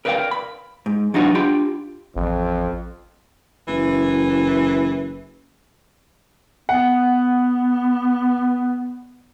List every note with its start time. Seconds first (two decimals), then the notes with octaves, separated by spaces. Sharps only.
0.05 A#4 B4 D5 D#5 F5 G5
0.31 B5
0.86 G#2
1.14 F#3 D4 D#4 F4 F#4 B4
1.34 D4 F4 G4 G5 B5
2.16 A1 F2
3.68 F#1 E3
6.69 B3 F#5